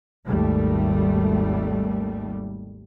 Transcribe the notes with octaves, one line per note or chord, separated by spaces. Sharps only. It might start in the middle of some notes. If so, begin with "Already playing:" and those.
G#1 D#2 G3 A3